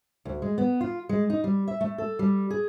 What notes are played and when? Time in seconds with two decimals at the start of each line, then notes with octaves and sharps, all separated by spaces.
0.25 D2
0.42 G#3
0.58 B3
0.81 F4
1.09 G#3
1.30 D#4
1.44 G3
1.68 E5
1.81 A3
1.98 A4
2.19 G3
2.50 G#4